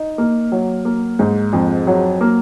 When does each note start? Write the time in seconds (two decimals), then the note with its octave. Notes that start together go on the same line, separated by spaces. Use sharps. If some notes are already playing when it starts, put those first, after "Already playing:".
Already playing: D#4
0.18 A#3
0.52 F#3
0.85 A#3
1.19 G#2
1.53 F2
1.87 F#3
2.21 A#3